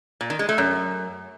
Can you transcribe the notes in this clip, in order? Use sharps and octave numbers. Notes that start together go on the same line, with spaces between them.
A#2
D#3
G#3
A3
F#2